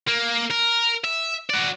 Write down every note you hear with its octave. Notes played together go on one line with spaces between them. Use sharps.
A#3
A#4
E5
F#4 D5